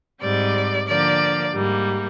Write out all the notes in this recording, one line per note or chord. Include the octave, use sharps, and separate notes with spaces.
G#2 G3 C4 D5
D3 F3 A#3 D5
G#2 G3 A#3